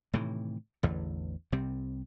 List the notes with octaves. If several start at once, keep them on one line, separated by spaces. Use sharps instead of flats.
A2 C3 D#3 E3
A1 E2 D3
C2 C3 G3 C4